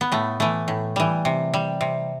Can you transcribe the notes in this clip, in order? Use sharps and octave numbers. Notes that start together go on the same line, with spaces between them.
B3
A2 A3
E3 A3
A2
E3 G3
C3
G3
C3